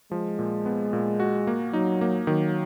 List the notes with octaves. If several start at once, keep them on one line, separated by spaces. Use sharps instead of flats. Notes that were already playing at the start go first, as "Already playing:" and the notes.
F3 G#3
A#2
B3
A#2
F#4
A#3
F#3 D#4
A#3
D#3 F#3